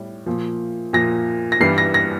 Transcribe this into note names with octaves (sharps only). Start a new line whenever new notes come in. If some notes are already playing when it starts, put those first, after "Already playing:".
Already playing: A2 G3
A#2 F3
A#2 F3 A#6
A#6
G2 E3 G3 C7
A#6
A#6